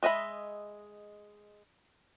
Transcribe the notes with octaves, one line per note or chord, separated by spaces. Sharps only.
G#3 D#5 E5 B5